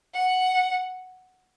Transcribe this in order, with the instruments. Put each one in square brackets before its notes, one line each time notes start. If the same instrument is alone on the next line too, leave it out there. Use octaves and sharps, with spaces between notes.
[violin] F#5